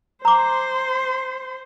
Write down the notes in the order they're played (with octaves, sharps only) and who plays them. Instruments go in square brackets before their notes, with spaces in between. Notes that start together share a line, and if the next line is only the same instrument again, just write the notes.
[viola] C5 C6 [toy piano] A#5 D6